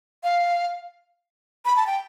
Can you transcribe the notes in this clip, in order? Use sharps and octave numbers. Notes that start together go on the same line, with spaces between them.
F5
B5
A5
G5